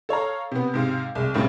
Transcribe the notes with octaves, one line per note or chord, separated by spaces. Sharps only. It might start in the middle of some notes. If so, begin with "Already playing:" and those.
A4 C#5 F5 A#5
C3 B3
G#2 C3 F5
C2 G#3
B1 A2 C#3 G3 C4